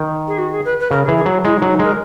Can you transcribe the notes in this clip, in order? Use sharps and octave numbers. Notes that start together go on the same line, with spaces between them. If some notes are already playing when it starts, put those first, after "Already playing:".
Already playing: D#3
G#4
F#4
G#4
B4
B4
C#3 A#4
E3 G#4
G#4
F#3
G#3 E4
D#4
F#3
D#4
G#3 A#4